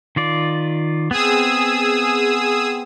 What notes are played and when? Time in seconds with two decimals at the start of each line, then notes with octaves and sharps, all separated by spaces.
0.16 D#3 F4 D5
1.11 B3 C4 G#4 D#6 E6